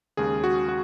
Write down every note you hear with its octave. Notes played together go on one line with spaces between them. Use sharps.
D#2 C#3 G#3 G#4
F#4
F#4